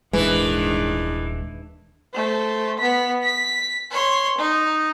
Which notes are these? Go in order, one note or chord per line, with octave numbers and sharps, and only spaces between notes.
D#1 G#2 D#3 E3 G#3 D4
A3 C5
B3 B6
B6
C#5 C6
D#4